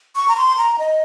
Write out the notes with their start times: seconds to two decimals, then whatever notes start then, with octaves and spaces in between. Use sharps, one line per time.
0.16 C#6
0.28 A#5
0.37 C6
0.58 A#5
0.79 D#5